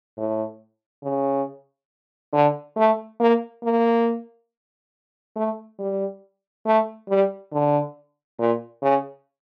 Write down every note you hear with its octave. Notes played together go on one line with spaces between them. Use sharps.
A2
C#3
D3
A3
A#3
A#3
A3
G3
A3
G3
D3
A#2
C#3